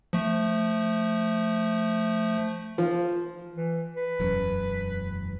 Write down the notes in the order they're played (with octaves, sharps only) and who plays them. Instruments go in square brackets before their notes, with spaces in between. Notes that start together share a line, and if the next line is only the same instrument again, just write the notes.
[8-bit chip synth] F3 A3
[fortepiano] F3
[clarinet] E3
B4
[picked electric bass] E1 F#2